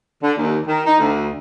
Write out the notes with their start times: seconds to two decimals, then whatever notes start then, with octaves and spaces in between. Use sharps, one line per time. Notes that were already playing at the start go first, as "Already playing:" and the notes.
0.22 D3
0.38 D#2
0.66 D#3
0.86 D#4
0.98 D2